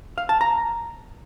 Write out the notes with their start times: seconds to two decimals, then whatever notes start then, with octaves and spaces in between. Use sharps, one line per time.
0.18 F5
0.29 A5
0.41 A#5